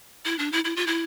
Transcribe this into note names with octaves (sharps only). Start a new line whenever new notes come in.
E4
D4
E4
E4
F4
E4